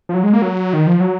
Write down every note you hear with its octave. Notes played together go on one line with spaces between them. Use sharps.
F3
F#3
G#3
A#3
F#3
D#3
F3
F#3